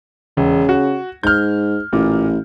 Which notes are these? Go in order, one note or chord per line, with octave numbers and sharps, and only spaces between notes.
E1 C#3
F#4
G#2 F6 G6
A1 A#2